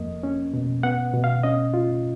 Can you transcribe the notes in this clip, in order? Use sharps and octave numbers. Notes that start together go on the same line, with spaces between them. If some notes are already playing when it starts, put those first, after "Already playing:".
Already playing: F2 A#3 D#5
C#4
B2
B3 F#5
B2
F5
C#4 D#5
F4